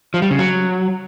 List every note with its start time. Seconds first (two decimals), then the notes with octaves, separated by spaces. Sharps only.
0.14 F3
0.22 G3
0.31 C#3
0.39 F#3